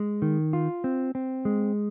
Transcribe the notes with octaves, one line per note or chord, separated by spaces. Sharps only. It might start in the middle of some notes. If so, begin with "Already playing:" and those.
Already playing: G#3
D#3
F4
C4
C4
G#3